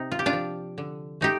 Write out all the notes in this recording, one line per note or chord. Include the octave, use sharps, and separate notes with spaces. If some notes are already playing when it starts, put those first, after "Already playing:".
Already playing: C3 C4 D#4
F4
G4
D4 F4
F3
D3
A3 D#4 G4